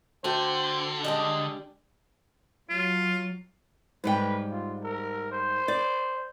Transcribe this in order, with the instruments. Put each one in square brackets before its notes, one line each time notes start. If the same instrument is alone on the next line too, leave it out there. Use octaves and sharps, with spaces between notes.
[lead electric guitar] D3 [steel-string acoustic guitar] A3 F#4 G5 [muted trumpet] C5
[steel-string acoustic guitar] G3 G#3 D4 [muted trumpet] D#5
[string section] F#3 [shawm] F4
[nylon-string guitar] G#2 G3 G5 [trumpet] B4
[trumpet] F4
A#4
C5
[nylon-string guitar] D5